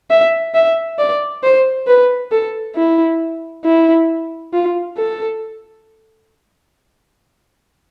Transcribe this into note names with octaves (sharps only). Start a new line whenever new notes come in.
E5
E5
D5
C5
B4
A4
E4
E4
F4
A4